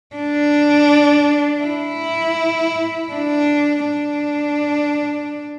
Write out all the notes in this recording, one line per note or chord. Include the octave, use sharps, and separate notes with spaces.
D4
E4
D4
D4